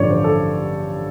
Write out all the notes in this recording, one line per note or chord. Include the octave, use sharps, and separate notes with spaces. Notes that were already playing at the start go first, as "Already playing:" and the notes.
Already playing: A1 G2 D3 F3 A3 C#5 D5
C5
A4